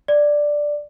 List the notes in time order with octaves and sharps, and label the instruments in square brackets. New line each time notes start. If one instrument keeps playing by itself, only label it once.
[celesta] D5